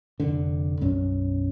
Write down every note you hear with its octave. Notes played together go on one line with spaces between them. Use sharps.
F1 D3
B1 F#2 C#4